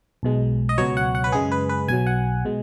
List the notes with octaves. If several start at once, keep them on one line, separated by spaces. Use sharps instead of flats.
B1 B2 G#3
D#5
C#2 B2 F#3 C#5
F#5
F#5
B4
F#2 C#3 G#3 G#4
B4
B4
B1 B2 F#3 G#5
F#5
B2 G#3